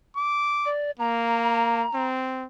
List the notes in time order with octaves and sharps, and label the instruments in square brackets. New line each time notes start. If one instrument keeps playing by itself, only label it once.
[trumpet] D6
[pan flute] D5
[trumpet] A#3 [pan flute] A#5
[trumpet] C4